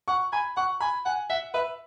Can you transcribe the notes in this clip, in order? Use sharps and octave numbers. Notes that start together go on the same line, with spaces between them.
F#5 C#6
G#5 B5
F#5 C#6
G#5 B5
F#5 G#5
E5 F#5
B4 E5